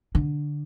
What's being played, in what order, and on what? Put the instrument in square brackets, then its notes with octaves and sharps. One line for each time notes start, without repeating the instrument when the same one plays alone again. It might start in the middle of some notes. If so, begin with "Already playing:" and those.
[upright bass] D3